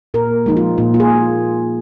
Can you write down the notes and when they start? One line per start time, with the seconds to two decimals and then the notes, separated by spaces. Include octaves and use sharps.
0.14 A#2 A#4
0.46 F3 G#3 D#4
0.57 F4
0.78 A#2 F4
0.94 F4
1.00 G#4